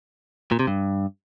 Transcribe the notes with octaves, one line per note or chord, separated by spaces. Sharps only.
A#2
C3
G2